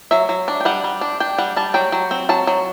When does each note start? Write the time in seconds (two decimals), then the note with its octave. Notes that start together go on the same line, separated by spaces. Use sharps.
0.11 F#3 E5
0.29 F#3
0.48 D4
0.61 G5
0.65 G3 F#5
0.84 G3
1.01 D4
1.20 D4 G5
1.38 G3 F#5
1.56 G3 A5
1.74 F#3 G5
1.92 F#3
2.11 C4
2.29 F#3 A5
2.47 F#3